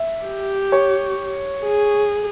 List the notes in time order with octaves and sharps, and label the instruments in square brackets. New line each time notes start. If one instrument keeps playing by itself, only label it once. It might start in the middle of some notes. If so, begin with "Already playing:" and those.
Already playing: [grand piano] E5
[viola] G4
[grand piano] C#5
[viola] G#4